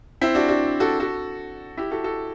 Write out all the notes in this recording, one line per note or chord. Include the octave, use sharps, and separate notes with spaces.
C4 E4
D4 F#4
D4 F#4
F#4 A4
F#4 A4
E4 G4
F#4 A4
F#4 A4